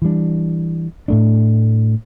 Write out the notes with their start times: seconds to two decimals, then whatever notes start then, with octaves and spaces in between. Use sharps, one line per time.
0.02 E3 G3 D4
1.08 A2 A3 D4